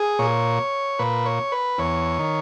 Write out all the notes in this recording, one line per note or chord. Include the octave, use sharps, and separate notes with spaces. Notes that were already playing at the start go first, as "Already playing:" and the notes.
Already playing: G#4
A#2 C#5
A#2 B4
C#5
B4
E2 C#5
D#3